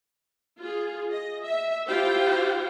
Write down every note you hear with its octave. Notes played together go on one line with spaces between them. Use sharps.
F4 G#4
D#5
E5
E4 F4 G4 C5 F5 G5